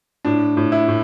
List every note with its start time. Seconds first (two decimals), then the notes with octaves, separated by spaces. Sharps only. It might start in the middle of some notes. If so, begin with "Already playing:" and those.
0.25 A2 D4
0.57 A2
0.72 E4
0.88 A2